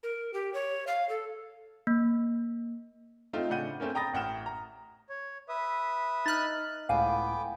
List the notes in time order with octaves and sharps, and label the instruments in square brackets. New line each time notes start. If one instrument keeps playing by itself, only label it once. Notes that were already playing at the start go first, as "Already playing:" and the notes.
[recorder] A#4
G4
C#5
F5
A4
[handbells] A#3
[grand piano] A3 C4 D#4 F4
A2 C#3 D4 F#5 G6 D#7
A3 C4 C#4 A#4
G5 A#5 B5 D#6 A6 A#6
A1 A2 F#5 G5 F6 E7
A#5
[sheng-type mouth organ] C#5
B4 E5 D#6
[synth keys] D#4 F#6 [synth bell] F6 A6
[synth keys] C#2 A2 [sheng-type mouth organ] B3 G5 D6 [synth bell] F5 G#5